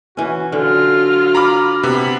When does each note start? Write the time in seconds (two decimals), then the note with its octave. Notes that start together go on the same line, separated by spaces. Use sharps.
0.17 E3 C#4 F#4
0.52 D3 F#3 F4 F6
1.35 A#5 B5 D6
1.83 C3 B3 B5